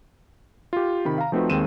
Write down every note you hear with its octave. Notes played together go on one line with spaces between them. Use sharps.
F4 G4
C3 D#3 B5
F5 A#5
F3 A3 C4 D#4 F#4 B4
D#2 D#3 G#3 C4 D#7 E7